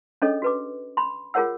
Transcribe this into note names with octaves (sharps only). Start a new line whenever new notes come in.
C#4 D4 G#4 A4 C#5 D#5
F#4 B4 D6
B5 C6
F4 G#4 A#4 C#5 F#5 E6